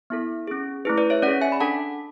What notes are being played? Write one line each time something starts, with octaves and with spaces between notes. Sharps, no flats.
B3 E4 A4
C#4 G#4
A3 E4 G#4 B4
B4 D5
C#5 E5
C#4 G#4 D5 F#5
E5 G#5
B5
D4 A4 F#5 A5